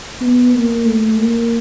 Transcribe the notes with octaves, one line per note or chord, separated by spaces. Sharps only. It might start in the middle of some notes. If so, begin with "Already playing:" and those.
B3
A#3
A3
A#3